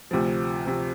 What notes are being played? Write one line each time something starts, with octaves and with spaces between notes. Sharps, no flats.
D2 C3 F3
C3 F3